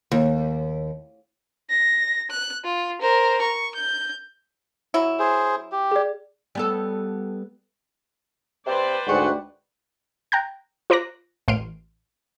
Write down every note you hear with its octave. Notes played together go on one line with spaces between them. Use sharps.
D#2
A#6
F#6
F4
A#4 C5
C#6
G6
F#3 E4
G#4 C5
G4
G#4 D5
G3 B3 A4
C3 B4 C5 D5
D2 G#2 G3 G#4 C#5 F#5
G5 A#5 F#6 G6
F4 C5 A#5 D6 F#6 A#6
A1 C6 F6 D7